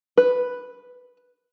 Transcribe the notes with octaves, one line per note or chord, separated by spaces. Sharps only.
B4